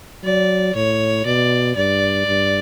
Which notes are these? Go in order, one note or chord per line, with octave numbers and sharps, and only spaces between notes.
F#3 D5
A2 C#5
B2 D5
G2 D5
G2